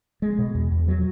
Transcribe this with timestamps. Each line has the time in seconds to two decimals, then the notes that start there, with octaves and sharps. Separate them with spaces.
0.22 G#3
0.38 B2
0.55 E2
0.72 E2
0.88 F#3